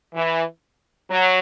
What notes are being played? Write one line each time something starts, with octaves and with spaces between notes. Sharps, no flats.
E3
F#3